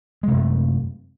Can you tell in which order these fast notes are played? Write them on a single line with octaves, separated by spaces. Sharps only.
G#3 C3 F#2 A3